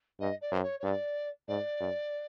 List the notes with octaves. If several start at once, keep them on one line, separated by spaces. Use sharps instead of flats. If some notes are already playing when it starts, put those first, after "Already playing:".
G2 D#5
D5
F#2 C5
C#5
C#5
G2 D5
G#2 D5
F#2